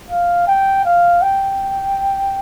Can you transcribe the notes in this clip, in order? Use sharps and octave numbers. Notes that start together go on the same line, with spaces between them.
F5
G5
F5
G5